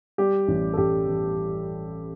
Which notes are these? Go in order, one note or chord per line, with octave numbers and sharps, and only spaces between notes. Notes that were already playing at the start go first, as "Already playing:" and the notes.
G3 G4
A1
A4
A1 G4
E3